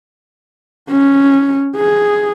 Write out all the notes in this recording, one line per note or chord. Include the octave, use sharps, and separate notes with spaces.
C#4
G#4